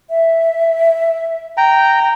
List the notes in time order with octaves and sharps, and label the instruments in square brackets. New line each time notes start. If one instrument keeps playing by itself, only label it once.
[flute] E5
[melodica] G5 A#5